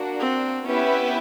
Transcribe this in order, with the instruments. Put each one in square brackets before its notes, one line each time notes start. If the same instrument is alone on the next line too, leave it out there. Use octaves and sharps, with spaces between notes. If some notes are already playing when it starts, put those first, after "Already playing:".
Already playing: [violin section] A#3 D4 F#4
[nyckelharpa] C4
[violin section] B3 E4 G4 B4 E5 [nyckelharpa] C#4